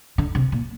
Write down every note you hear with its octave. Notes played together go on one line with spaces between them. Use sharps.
D3
C3
A#2